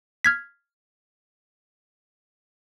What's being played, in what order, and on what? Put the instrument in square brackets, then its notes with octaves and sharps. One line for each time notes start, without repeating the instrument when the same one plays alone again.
[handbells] F6 G#6 B6